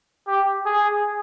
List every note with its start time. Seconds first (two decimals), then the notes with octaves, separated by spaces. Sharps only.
0.27 G4
0.66 G#4